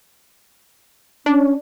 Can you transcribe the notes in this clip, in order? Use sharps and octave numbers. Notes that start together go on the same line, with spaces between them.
C#4 D4